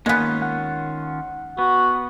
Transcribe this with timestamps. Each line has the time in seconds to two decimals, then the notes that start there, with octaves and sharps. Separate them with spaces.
0.06 D#3 G#3 A#3 B3 C#4 F4
0.42 F#5
1.58 B3 F#4